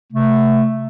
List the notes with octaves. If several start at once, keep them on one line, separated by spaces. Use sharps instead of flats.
C3 A3